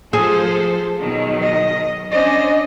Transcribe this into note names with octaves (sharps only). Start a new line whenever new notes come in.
F3 G#4 A4 C5
B2 D#3 F#3
D#5
C#4 D4 C5 D#5